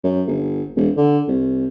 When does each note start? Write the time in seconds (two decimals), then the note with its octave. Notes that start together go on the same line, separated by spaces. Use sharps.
0.04 F#2
0.27 G1
0.76 E1
0.97 D3
1.28 C2